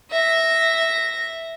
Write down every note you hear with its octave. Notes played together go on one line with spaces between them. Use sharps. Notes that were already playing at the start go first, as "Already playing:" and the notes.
E5 A#6